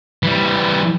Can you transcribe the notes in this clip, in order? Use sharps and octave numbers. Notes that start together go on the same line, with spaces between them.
E3 G3